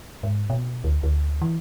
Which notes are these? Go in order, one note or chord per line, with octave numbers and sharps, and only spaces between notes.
G#2
B2
D2
D2
E3